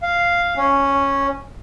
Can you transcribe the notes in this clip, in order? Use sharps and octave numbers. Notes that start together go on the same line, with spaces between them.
F5
C#4